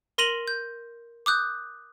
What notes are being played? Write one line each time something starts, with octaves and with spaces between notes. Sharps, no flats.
A#4 C6 A#6 D#7 F7 F#7
G6
D6 D#6 F#6 G6